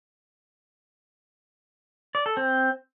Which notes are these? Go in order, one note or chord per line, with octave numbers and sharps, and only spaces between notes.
D5
A4
C4